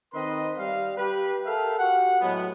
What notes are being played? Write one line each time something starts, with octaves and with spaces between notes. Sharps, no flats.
D#3 C4 B4 D#5 C6
G3 F5
G4 B4
A4 A#4 E5 F5 G5
F#4 G4 F#5
A2 F#3 G#3 B3